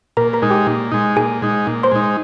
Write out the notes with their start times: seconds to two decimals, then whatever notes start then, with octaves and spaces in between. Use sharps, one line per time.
0.17 A#2 A#4 A#5
0.33 A#4 A#5
0.42 G#3 D#4
0.50 G4 G5
0.67 A#2
0.92 G#3 D#4
1.17 A#2 G#4 G#5
1.42 G#3 D#4
1.67 A#2
1.83 C5 C6
1.91 G#3 D#4